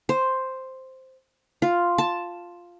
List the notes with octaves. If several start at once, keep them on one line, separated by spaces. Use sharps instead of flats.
C5
F4
A5